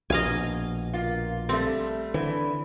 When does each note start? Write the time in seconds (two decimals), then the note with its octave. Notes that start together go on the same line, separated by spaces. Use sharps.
0.10 A#1 B2 D#5 F5 G#5
0.94 A#3 F4
1.49 G3 A3 C4
2.14 D3 E3